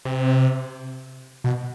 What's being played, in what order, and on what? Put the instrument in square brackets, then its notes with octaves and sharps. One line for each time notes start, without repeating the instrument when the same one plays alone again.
[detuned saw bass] C3
B2